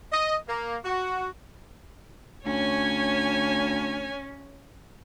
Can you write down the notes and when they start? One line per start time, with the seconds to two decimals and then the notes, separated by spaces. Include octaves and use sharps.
0.12 D#5
0.48 A#3
0.84 F#4
2.46 D2 C#4 C#5 G#5